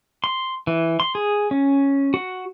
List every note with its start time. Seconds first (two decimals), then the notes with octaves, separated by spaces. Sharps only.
0.24 C6
0.67 E3
1.00 C6
1.15 G#4
1.51 C#4
2.14 F#4